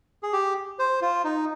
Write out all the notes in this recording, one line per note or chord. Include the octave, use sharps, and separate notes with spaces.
G#4
G4
C5
F4
D#4